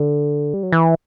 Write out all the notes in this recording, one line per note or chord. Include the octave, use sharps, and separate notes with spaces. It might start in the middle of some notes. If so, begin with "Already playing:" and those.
Already playing: D3
G3
F#3
E3